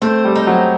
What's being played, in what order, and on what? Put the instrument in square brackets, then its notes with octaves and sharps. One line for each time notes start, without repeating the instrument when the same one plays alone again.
[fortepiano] A3 [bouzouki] C4
[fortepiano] G3
[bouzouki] D#4
[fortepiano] F#3